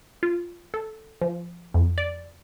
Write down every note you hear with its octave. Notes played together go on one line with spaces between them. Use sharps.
F4
A4
F3
F2
D5